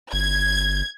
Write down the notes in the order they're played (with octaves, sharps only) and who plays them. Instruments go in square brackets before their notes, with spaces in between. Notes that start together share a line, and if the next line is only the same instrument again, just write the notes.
[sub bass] G1 [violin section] G#6